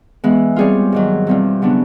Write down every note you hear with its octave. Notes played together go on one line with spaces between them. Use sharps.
E3 G#3 B3
G3 C4 F4 G#4 C#5
G#2 D#3 F#3
E2 B2 G3 C4 F4
C#3 F#3 B3 D4 G4